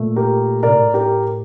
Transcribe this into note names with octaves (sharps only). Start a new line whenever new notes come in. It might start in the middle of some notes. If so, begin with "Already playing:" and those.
Already playing: A#2 A3
G4 A#4
A2 A3 A#4 D5
G4 A#4